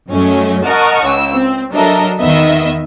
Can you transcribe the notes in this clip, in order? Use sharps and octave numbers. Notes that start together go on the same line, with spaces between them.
F#2 F#3 A3 C#4 D#5
A#4 D#5 F#5 A5 C#6 F6
C#2 E6
C4
F#3 D4 A4 A#4 D#5 E5
E2 D#3 B3 D#5 E5